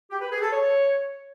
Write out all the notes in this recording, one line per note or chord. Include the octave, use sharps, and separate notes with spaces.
G4
B4
G#4
A4
C#5